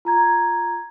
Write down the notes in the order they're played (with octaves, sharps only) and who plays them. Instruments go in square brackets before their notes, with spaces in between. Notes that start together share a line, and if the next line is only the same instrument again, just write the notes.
[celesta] F4 A#5 G#6